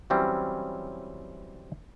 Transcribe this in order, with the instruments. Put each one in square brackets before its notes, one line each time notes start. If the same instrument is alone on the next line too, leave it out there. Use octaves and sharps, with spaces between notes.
[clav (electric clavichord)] E3 F#3 G3 C4 C#4